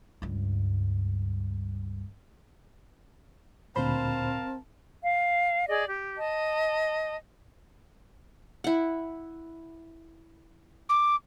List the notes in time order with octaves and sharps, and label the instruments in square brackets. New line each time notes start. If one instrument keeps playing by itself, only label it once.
[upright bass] C#2 G2
[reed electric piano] D2 A#2 B5 [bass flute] C4 [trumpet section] A#4 F5 A5 [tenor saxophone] C5
[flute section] F5
G#4 D5 D#5
G4
D#5 A5
[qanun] E4 F#5
[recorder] D6